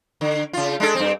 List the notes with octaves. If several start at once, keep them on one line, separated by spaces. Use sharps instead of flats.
D3
C#3 F4
G#3 D4 A4
G2 C4